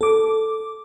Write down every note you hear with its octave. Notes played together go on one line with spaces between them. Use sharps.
A4 D6